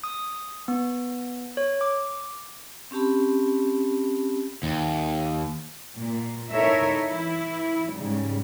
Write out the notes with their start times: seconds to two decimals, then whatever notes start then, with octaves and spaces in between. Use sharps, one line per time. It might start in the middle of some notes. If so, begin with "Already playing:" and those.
0.04 D#6
0.68 B3
1.57 C#5
1.81 D6
2.91 C4 C#4 G4 A5 B5
4.63 D#2
5.97 A#2
6.51 D#4 E4 A4 A#4 C#5 E5
7.08 E3 E4
7.93 G#2 C#3 G3